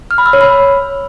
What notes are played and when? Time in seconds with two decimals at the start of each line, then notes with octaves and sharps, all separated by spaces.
0.11 F6
0.18 B5
0.26 E6
0.33 C#5
0.41 B5